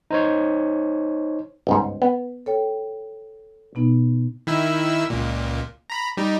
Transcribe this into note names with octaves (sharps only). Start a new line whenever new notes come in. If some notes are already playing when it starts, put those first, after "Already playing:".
D#4 C5 C#5
G1 C#2 G#2
B3
A4 C#5 G5
B2 B3 D#4
D#3 E4 E6
C#2 A#2
A#5 B5
G3 D#4